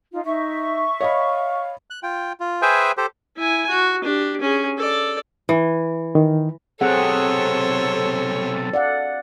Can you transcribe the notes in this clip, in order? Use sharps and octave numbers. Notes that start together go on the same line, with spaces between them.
D#4 F4
D#4 E5 C#6
C#5 D#5 F5 B5
F#6
F4 G5
F4
G#4 B4 C5 E5 G5 G#5
G4 A4 C5
E4 G#5
F#4
D4 G4
C#4 G#4
A4 D5
E3
D#3
B1 C3 C4 G#4 A4 C5 C#5 F#5
D5 F5 F#5